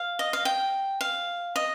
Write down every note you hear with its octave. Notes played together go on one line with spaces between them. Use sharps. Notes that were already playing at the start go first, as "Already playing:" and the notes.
Already playing: F5
D#5
F5
G5
F5
D#5